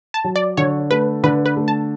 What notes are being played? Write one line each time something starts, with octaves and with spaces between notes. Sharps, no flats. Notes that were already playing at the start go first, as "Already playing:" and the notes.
A5
F#3
D5
D3 C#5
A3 B4
D3 B4
B4
A3
A5